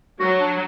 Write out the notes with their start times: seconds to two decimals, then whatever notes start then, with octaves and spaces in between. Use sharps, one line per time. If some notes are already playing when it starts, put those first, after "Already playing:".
0.20 F#3 F#4
0.39 D4